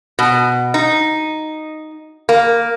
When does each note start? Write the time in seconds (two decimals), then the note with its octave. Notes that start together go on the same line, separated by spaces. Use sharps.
0.19 B2
0.74 D#4
2.29 A#3